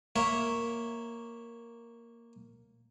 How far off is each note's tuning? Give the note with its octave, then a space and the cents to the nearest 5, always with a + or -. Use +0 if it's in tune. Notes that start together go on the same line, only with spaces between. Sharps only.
A#3 +0 C#5 -5 E5 +0